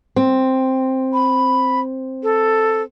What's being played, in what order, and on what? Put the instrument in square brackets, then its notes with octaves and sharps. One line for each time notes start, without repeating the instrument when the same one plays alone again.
[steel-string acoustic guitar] C4
[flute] B5
A4